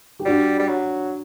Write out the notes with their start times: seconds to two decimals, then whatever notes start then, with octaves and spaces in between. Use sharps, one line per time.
0.19 G4
0.25 G3 D4 F#4
0.60 G3
0.68 F#3